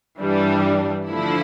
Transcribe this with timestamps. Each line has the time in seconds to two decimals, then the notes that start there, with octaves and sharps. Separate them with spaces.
0.18 G2 E3 G3 D4
1.09 D3 F3 A3 E4